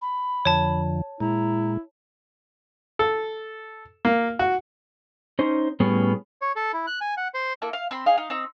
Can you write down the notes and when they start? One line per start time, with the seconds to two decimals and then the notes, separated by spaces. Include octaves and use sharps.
0.02 B5
0.45 F2 D3 F3 C#5 A5
1.20 A#2 G#3 E4 A#5
2.99 A4
4.05 A#3
4.39 F#4
5.39 C#4 D#4 C5
5.80 A2 G3 B3 C#4 G#4
6.42 C#5
6.56 A4
6.73 E4
6.87 F#6
7.01 G#5
7.17 F#5
7.34 C5
7.62 A#3 E4 A4
7.73 F5
7.91 C4 B5 C6
8.06 D#4 G#4 F5
8.17 D#4 F5
8.30 C4 D#4 E6